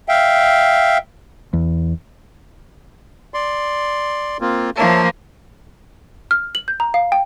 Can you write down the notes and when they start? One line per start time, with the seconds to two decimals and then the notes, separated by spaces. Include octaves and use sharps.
0.08 E5 F5 G5
1.53 E2
3.34 D5 C6
4.41 A#3 C4 F4
4.77 F3 A#3 C#5 E5 A5
6.31 F6
6.55 F#7
6.68 G6
6.80 A#5
6.94 F5
7.12 G5